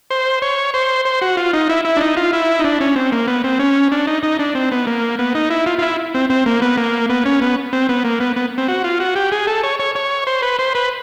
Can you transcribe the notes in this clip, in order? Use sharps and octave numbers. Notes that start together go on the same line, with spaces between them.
C5
C#5
C5
C5
F#4
F4
D#4
E4
E4
D4
D#4
F4
E4
D#4
D4
C#4
C4
A#3
B3
C4
C#4
D4
D#4
D#4
D4
C4
B3
A#3
B3
D#4
E4
F4
F4
E4
C4
C4
A#3
B3
A#3
B3
C#4
B3
C4
B3
A#3
B3
B3
C4
F#4
F4
F#4
G4
G#4
A4
C#5
C#5
C#5
C5
B4
C5
B4